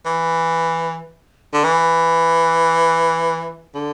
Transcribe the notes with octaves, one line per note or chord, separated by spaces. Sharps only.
E3
D3
E3
D3